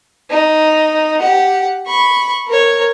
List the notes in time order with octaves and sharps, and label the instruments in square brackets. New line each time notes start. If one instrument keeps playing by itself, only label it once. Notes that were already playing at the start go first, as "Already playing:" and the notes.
[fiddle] D#4
G4 F#5
B5 C#6
A#4 C#5